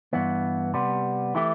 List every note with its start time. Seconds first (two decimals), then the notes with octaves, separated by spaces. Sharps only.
0.13 G2 E3 B3
0.74 C3 G3 B3
1.35 E3 A3 E4 G4